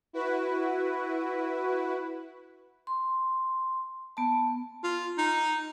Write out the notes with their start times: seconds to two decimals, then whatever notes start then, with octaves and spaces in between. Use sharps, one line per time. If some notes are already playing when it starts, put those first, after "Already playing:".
0.13 E4 F#4 B4
2.87 C6
4.17 B3 A5
4.84 F4
5.18 D#4